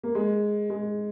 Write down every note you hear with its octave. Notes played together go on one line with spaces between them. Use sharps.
A#3
G#3
G#3